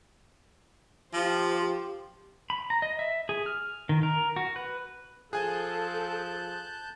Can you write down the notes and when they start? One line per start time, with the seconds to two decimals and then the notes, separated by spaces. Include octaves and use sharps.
1.14 F3 G4 C5
2.50 B5
2.70 A#5
2.82 D#5
2.99 E5
3.29 G#4
3.46 F6
3.89 D#3
4.03 A#4
4.36 F#4
4.56 B4
5.33 F3 G#4 A4 G#5 A5 F#6 G6